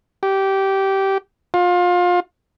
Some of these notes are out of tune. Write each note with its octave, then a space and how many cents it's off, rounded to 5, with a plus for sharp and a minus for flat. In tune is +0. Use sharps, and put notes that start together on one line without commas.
G4 -15
F4 +25